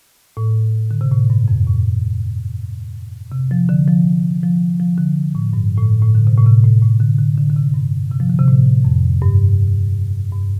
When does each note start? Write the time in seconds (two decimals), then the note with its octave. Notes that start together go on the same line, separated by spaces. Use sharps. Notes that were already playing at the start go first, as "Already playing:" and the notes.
0.37 A2
0.91 D3
1.01 C3
1.11 A2
1.30 G2
1.48 F2
1.67 A2
3.32 C3
3.51 F3
3.69 D3
3.88 F3
4.43 F3
4.80 F3
4.98 D3
5.35 A2
5.53 G2
5.78 A2
6.03 A2
6.15 D3
6.27 C3
6.37 A2
6.46 C3
6.64 A2
6.82 A2
7.00 D3
7.19 D3
7.38 D3
7.50 D3
7.56 C3
7.74 G2
8.11 C3
8.20 F3
8.30 D3
8.39 C3
8.48 A2
8.85 F2
9.21 G2
10.32 G2